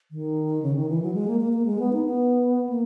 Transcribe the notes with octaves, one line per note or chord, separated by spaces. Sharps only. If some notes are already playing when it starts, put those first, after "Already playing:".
D#3
C#3
D#3
E3
F#3
G#3
A#3
A#3
A#3
G#3
B3
D#4
B3
A#3